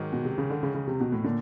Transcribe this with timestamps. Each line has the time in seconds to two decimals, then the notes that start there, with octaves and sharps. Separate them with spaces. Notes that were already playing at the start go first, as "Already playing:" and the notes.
Already playing: G#2 D#3 F#3
0.13 B2
0.25 C3
0.38 C#3
0.50 D3
0.63 C#3
0.74 C#3
0.87 C3
1.00 B2
1.12 A2
1.24 A#2 D3